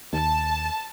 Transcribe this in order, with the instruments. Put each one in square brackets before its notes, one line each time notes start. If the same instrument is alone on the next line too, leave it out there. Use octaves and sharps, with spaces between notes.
[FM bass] D#2 [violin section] A5